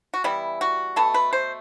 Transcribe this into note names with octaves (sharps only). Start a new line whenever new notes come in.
F#4
E3 G3 B3 E4
F#4
B2 A3 A4
B4
C5